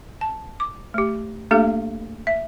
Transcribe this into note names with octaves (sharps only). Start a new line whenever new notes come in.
A5
D6
A3 G4
A3 A#3 D4 G4 A4 F5
E5